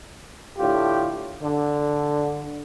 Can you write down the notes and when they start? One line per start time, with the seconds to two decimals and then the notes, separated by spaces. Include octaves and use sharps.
0.58 A2 D3 F4 G4
1.42 D3